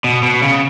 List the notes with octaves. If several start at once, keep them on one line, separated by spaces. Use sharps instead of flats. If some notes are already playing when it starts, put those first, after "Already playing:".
B2
B2
C#3